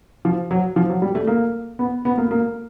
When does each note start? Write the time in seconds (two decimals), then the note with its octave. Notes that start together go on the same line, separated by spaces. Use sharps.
0.25 F3
0.51 F#3
0.76 F3
0.90 F#3
1.02 G3
1.15 A3
1.27 A#3
1.79 B3
2.05 B3
2.18 A#3
2.31 A#3